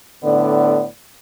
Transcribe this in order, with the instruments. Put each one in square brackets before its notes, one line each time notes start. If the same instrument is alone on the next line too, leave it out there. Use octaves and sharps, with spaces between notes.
[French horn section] A2 D3 B3 D5